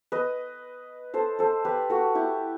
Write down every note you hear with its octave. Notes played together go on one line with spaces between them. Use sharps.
B4 D#5
A4 C5
A4 C5
G4 B4
F#4 A4
E4 G4